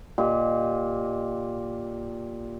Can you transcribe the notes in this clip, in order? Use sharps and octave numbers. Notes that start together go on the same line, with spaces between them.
A#2 G4 D#5